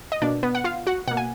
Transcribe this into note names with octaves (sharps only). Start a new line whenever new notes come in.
D#5
B2 A#3 D4 D5
B3 B4
F#5
F4 F5
F#4 F#5
B2 A#3 F#5
G#5